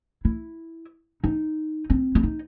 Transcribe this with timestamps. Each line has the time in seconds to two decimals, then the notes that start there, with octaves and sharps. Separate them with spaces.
0.25 E4
1.24 D#4
1.90 C4
2.15 E4
2.23 D#4